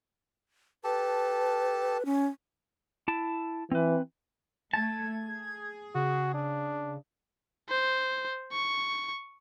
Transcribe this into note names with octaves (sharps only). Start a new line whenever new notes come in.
G4 A4 B4 A5
C#4
E4 A5
E3 C4 B4
A3 A5 G#6
G#4
C#3 F#4
D4
C5
C#6